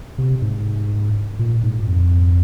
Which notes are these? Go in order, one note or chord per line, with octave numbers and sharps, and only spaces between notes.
C3
G#2
A#2
G#2
F2